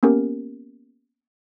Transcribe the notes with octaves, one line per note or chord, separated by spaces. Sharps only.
A#3 B3 C#4 G4 A#4